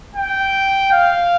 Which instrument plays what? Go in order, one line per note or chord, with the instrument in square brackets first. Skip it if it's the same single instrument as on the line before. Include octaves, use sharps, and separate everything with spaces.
[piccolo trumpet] G5
F5